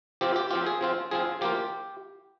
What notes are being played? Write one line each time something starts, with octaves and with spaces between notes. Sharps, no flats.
F3 C4 F4 G4
G4
F3 C4 F4 G4
G#4
F3 C4 F4
F3 C4 F4 G#4
F3 A#3 F4 G4